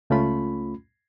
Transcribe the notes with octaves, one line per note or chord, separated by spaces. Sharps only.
C#2 A3 C#4 F4 B5